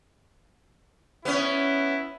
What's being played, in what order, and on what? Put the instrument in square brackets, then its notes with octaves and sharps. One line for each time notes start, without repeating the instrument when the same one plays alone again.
[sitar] B3 C#4 [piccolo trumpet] E4